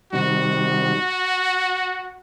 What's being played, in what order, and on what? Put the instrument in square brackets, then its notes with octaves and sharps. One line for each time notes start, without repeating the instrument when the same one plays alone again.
[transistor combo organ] C3 D#3 G3 [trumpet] F#4